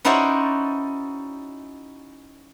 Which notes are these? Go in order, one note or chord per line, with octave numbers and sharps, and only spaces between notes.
C#4 D#4 E4 F#4 C5 D5